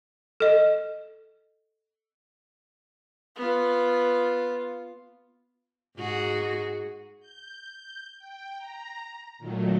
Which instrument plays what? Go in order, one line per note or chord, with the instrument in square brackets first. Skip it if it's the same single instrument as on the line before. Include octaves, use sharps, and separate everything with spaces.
[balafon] A4 D#5
[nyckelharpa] B3 F4
[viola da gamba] G#2 F#4 G#4
[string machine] G6
G5
A#5
A#2 D#3 F#3 A3